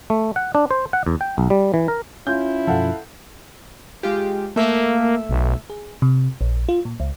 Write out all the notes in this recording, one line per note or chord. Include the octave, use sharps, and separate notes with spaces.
A3
F#5
D4
C5
F#5
E2
G5
B1
G3
E3
A#4
C#4 E4 F4 G6
F#2 B2 F3 A4 F5 F#5
G#3 F4 G4
A3 A#3 E5
B1
G#4
C3
A#1
F4
A#2
C#2